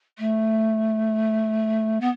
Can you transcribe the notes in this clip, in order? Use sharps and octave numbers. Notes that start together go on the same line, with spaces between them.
A3
B3